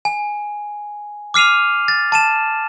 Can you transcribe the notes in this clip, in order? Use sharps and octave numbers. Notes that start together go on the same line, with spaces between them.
G#5
D6 F6 C7 D#7 F7
A6
A5 D#7 E7